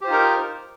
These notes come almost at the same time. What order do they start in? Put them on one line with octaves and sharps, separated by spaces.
G4 C5 F4 D#4 A#4